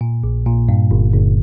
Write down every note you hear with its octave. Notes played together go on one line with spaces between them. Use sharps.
A#2
A#1
A#2
G2
G1
G1